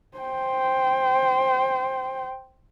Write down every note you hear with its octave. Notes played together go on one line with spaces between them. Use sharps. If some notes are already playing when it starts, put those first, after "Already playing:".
C5 G5